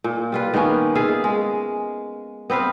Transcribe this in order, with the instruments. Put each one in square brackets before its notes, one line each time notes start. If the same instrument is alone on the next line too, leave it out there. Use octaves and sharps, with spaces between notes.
[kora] A#2
G3 F4 B4
D#3 A#3 B3 C#4
F4 G#4 E5 F5
G#3
B3 C4 B4 F5